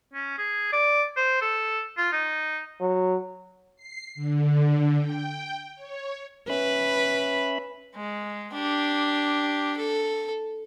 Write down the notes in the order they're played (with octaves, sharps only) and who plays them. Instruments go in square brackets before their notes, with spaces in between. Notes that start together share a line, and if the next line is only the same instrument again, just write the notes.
[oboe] C#4
G#4
D5
C5
A4
F4
D#4
[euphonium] F#3
[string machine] C7
D3
G5
C#5
[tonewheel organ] C#4 E5 B5 [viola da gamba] B4
[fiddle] G#3
D4 G4
A4